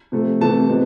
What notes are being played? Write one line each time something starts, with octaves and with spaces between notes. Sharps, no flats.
C3 F3 A3
C3 E3 A3 A5
C3 F3 G#3 B3